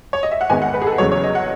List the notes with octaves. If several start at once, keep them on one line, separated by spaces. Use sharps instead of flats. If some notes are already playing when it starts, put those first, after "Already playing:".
C#5
D#5
E5
F#5
G#2 D#3 G#3 B3 D#4 G#5
F#5
B4
G#4
A4
E2 C#3 F#3 C#5
C#5
D#5
F#5